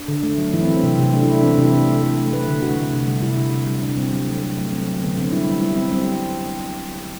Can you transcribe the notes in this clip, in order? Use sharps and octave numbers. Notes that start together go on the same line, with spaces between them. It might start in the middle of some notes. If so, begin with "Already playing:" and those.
Already playing: D4
D3
A3
F#3
E3 E4
C4
E3
C4
C3
C3
A3 D4
E4
A3
D4
E3 C4
D4
C3
E4
A3
A3
A3
A3
A3 B4
D3
A3 F#4
D3
C3
G3
C3 E4
C3
C3
G3
C3 D4
G3 C4
F#3
A3
A3
F#3
A3 C4
F#3
D3 B3
D3 C4
G3 E4
G3
G3 E4
G3 C4
G3 C4